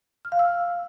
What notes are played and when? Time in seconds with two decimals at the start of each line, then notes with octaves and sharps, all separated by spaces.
0.25 F6
0.32 F5
0.39 E6